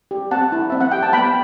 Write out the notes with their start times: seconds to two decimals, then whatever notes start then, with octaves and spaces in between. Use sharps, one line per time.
0.11 G4
0.31 C4 F#5 A5
0.52 E4
0.70 C4 E5
0.81 F#5
0.91 G4 G5
1.02 A5
1.13 B3 G5 B5